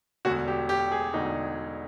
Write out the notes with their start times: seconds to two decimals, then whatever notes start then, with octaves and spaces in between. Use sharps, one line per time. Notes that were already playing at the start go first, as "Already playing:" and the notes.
0.25 E1 D2 D3 F#4
0.48 G4
0.69 G4
0.92 G#4
1.14 E1 D2 D3 D#4